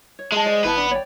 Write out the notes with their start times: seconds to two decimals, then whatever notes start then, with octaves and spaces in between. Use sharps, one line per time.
0.19 C#5
0.32 G#3 E5 A5
0.45 C5 D5 D#5
0.64 G#1 B3 E4 B4 A5
0.77 D4 B5
0.91 C#5 D5 G5